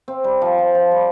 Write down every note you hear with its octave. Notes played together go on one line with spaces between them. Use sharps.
C4
G3
F3
F3
F3
G3